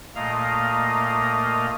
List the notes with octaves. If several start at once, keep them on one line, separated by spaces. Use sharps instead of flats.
A#2 A3 A#3 D#5 F5 A#5